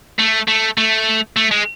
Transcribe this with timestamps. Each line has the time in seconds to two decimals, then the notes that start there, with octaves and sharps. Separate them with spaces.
0.19 A3
0.48 A3
0.78 A3
1.36 A3
1.51 G#3